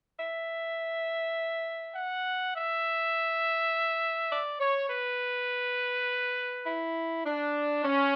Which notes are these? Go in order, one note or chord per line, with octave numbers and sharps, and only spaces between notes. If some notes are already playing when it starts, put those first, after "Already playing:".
E5
F#5
E5
D5
C#5
B4
E4
D4
C#4